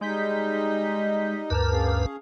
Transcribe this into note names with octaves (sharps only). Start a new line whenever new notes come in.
G3 G#3 D#4 D#5 G6 B6
D2 G2 A#4 B4 A5 F6
C#4 G#4 F5